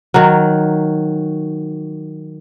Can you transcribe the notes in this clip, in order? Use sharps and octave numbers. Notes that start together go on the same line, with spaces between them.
D#3 F#3